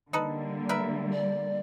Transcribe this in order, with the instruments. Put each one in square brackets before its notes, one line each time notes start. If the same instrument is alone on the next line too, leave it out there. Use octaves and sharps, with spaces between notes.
[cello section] D3 G3 A#3 [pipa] D#4 A4 B4
[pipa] A#4 B4 E5
[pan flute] D5